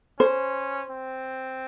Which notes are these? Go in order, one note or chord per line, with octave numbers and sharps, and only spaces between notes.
C#4 C5
C4